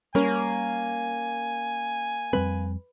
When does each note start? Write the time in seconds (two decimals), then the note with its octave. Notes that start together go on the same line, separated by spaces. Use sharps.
0.15 G3 A#3 C#4 A#4 G#5
2.33 F2 G3 C4 B4